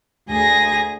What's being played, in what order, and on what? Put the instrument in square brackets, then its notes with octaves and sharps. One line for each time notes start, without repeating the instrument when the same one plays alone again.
[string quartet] D2 G#4 A#6